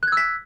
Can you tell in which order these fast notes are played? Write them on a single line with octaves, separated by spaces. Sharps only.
F#6 G#6 E6 B6